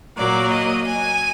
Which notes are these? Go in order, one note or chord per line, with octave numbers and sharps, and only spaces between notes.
A#2 F#3 A#3 D5
D#5
G#5